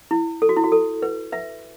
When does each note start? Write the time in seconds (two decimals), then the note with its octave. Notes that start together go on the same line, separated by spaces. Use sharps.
0.11 E4
0.42 A4
0.49 F#4
0.56 E4
0.64 F#4
0.72 A4
1.02 B4
1.32 B4 E5